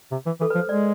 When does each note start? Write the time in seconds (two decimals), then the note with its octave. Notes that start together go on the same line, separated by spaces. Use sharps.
0.11 C3
0.26 E3
0.40 E3 A4
0.50 B4
0.55 F3
0.59 C5
0.68 G#3 D5